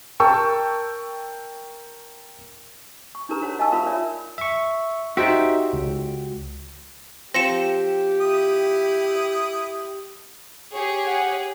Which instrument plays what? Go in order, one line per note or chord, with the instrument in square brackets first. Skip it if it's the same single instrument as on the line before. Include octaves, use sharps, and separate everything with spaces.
[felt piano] A#4 G5 A5 C#6 E6
[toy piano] C#6
D4 D#4 G4 A#4 B4 A#5
F#4 C5 C#5 F#5
D#5 F5 G#5 A5 C#6 E6
F4 A#4 C5 E5 F5 B5
F4 A#4 C#5 D5 E5
[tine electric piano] E5 C#6
[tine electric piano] D#4 C5 E5 [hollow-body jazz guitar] F#4 G4
[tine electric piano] C#2
[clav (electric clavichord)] F3 C4 [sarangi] G4 [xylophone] A#6 C#7 E7
[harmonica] E4 D#6
[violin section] G4 G#4 C#5 [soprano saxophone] C#6
[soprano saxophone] F#5